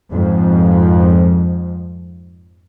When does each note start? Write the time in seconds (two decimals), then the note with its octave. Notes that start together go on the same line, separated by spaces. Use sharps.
0.11 F2 G#2 F3